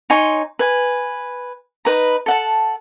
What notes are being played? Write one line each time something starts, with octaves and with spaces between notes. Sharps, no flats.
D#4 C#5 G#5 C6
B4 G#5
D#4 B4 A#5
A4 F#5 A5